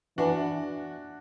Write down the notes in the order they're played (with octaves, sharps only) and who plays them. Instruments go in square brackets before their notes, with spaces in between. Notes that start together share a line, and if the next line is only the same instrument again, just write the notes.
[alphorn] E3 [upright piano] D4 F#4